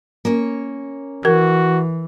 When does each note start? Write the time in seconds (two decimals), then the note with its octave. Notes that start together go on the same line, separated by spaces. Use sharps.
0.25 A#3 C#4 C#5
1.25 E3 F#4 A#4